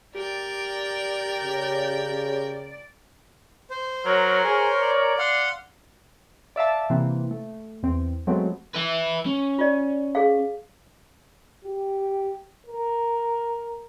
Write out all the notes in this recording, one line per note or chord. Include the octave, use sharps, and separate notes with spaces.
G4 A#4 D5 G5
C#3
C5
F#3 A#4 C#5
G#4
D5
F5 F#5 C6
D5 E5 F5 A5
C3 E3 A#3 C4
A3
E2 C4
F#3 G#3 A3 B3 C4
B4 E5
C#4
F4 D5
G#4 F5
G4
A#4